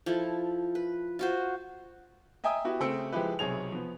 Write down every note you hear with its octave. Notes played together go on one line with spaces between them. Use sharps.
F3 E4 A4
B4
F4 F#4 C5
D#5 E5 G5 G#5 A#5 D#6
B3 E4 F#4 G4
C#3 A3 C4 G5 E6 C#7
F3 G#3 E4 G4 B4
B1 C3 G#4 C#5 F7
F3 B3